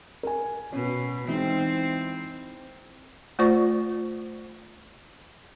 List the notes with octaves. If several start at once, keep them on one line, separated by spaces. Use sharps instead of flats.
A#4 G#5
B2 C#4
E3 G#3 C4 D#4
A3 F4 C5 D5 C#6